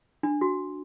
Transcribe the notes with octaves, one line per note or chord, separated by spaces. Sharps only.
D4
F#4